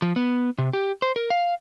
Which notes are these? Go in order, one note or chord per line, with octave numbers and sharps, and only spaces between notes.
F3
B3
C3
G4
C5
A#4
F5